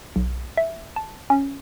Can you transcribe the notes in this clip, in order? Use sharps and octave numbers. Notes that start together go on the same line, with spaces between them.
B1
E5
A5
C#4